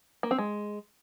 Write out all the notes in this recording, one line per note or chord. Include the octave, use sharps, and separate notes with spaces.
A#3
C4
G#3